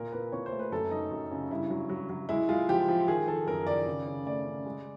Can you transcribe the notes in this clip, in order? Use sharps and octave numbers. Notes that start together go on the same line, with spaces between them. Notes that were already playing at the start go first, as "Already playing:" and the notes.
Already playing: A#2 A#4
A#2 B4
A#2 C#5
C5
A3
B4
F#2 A4
F#3 D#4
F#2
C#3
G2 E4
F#3
F#3
F#3
G#3 E4
G#3 F4
F3 G4
F3
D#3 G#4
D#3 A4
F#2 A#4
D#3 D5
C#3
C#3
A3 D5
C#3
G#3